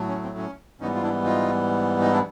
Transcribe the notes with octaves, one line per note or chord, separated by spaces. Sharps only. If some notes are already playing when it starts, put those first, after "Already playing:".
Already playing: A2 F#3 A3
C#4
C4
C#4
G#2 E3 G3 B3 C#4 D#4
F4
D4 E4
D#4 F4
D#4
D4 E4